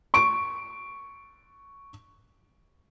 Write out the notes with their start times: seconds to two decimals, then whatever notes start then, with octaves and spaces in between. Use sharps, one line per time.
0.14 C#6 D7